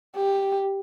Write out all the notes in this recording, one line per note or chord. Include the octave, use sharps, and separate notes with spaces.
G4